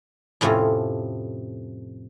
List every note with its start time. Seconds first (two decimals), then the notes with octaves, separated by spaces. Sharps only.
0.41 F2 A2 C3 F3 C#4